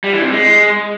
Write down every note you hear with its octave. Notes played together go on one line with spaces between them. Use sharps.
G3
E3
C3
G#3